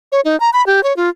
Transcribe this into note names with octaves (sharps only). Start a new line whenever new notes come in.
C#5
D#4
A#5
B5
G4
C#5
F4